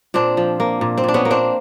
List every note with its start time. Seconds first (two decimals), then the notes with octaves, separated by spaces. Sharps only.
0.14 A#2 C4 D4
0.37 F3
0.60 A#3
0.81 A#2
0.98 C4
1.04 A#2 D4
1.14 B3 C#4
1.25 A#3
1.31 C4 D4